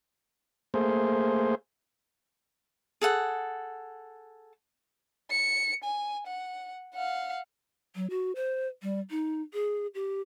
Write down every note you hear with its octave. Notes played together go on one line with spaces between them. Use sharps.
A3 A#3 G#4 C5
G#4 A4 F#5
C#7
G#5
F#5
F5 F#5
F#3
F#4
C5
G3
D#4
G#4
G4